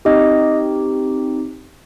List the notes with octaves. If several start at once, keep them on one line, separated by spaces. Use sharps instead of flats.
C4 D#4 G4 D#5